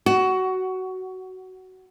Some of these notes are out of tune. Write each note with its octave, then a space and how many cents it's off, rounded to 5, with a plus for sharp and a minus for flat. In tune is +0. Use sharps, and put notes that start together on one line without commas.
F#4 +15